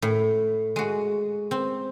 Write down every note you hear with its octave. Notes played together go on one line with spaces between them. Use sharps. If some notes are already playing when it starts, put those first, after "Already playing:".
A2
G#3 F#4
C4